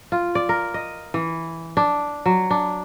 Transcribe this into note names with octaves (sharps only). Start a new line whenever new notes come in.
F4
D5
A#4
D#5
E3
D4
F#3
D4